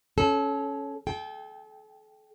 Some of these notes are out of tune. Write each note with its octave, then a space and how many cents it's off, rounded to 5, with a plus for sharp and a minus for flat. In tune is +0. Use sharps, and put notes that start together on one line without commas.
C#4 +0 A4 -25
A4 -40 G5 +0